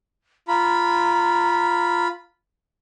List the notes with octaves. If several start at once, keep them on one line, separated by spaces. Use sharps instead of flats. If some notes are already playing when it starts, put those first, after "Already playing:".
F4 A#5 B5